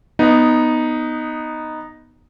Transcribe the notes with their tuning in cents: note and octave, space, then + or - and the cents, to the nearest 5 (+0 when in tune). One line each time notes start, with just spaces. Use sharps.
B3 +0 D#4 +0